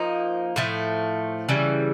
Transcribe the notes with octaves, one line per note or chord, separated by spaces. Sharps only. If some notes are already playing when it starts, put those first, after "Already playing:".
Already playing: F3 A#3 D#4
A2 F3 A3
C#3 E3 G3